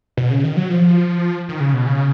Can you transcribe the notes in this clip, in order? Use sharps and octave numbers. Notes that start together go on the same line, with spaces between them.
B2
C#3
D#3
F#3
F3
D#3
C#3
B2
C#3